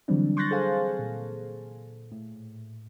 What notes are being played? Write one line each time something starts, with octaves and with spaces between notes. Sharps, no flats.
D3 E3 F#3 G3 C4 D4
C6 C#6 F#6 G6 A6 A#6
G#4 A4 C5 F5 G#5
A#2
A2